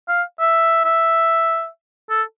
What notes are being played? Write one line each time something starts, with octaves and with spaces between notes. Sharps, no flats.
F5
E5
E5
A4